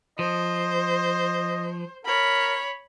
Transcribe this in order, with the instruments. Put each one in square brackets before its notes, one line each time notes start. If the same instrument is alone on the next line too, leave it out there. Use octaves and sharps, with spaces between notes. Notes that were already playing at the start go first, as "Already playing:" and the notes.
[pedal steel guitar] F3 [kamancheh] C5 [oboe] D#5
[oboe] A#4 [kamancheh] C#5 B5